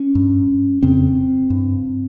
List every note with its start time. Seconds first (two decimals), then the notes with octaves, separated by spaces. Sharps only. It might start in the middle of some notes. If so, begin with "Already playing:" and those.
Already playing: C#4
0.15 G2
0.83 F2 C#3 C4
1.50 G2